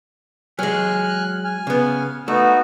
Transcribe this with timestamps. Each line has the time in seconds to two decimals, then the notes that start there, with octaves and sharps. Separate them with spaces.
0.59 F#3 G#3 G#5 F6 F#6
1.44 G#5 F6
1.67 C#3 B3
2.28 A3 B3 D#4 F#4